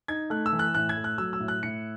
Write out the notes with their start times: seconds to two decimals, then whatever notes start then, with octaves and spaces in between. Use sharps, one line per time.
0.08 D#4 G#6
0.30 A3 F#6
0.46 E6
0.53 E3
0.59 F#6
0.75 A2 F#6
0.89 G#6
0.97 A3
1.04 F#6
1.18 F#3 E6
1.33 E6
1.40 A2
1.48 F#6
1.63 A2 C#7